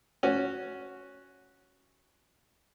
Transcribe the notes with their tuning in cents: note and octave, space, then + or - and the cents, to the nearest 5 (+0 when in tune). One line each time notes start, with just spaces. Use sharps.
C#4 +0 F#4 +0